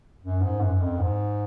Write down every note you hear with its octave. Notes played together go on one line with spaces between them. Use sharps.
F#2
G#2
F#2
F2
G#2